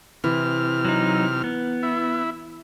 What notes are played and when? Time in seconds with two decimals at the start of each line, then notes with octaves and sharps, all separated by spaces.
0.24 C3 E3 F6
0.85 F#3 D#4
1.44 B3
1.83 E4